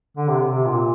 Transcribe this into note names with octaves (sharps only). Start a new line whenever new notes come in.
D3
C3
C3
A#2